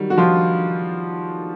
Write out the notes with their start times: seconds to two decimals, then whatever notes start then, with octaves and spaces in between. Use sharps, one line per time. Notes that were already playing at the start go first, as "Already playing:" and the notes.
Already playing: D#3 F#3 G3
0.10 F#4
0.17 F3 F4